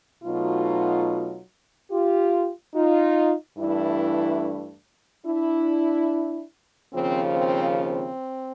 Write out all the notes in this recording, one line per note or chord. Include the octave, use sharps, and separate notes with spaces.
B2 F#3 A3 D#4 F4
F4 G4
D#4 F4
G2 E3 A3 D4 E4
D4 E4
D#2 C#3 F3 C4
C4
C4